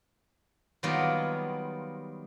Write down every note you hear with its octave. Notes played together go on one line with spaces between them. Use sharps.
D#3 F#3 G3 A#3 B3 F4